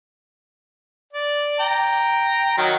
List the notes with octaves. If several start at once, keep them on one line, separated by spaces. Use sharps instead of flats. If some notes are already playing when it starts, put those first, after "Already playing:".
D5
G5 A#5
D#3 F#3